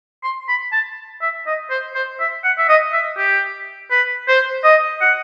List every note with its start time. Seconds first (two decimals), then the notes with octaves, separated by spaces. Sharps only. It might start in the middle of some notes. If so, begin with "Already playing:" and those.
0.24 C6
0.48 B5
0.73 A5
1.22 E5
1.46 D#5
1.70 C5
1.95 C5
2.20 E5
2.44 F#5
2.58 E5
2.69 D#5
2.93 E5
3.18 G4
3.91 B4
4.28 C5
4.64 D#5
5.01 F#5